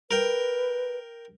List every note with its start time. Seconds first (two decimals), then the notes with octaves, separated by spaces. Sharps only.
0.11 A#4 B4 G5